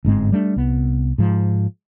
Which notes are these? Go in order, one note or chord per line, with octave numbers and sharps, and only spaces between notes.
G1 G#2 G#3 C4
G3 A3 B3 D4
C2 B3
G#2 F3